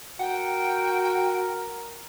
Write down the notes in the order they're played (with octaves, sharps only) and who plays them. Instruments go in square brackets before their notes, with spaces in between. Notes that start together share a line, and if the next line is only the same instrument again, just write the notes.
[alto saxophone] F#4 [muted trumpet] A#4 [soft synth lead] F#5 [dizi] G5